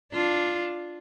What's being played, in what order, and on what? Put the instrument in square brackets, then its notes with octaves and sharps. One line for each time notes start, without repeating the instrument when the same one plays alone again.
[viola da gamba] D4 F4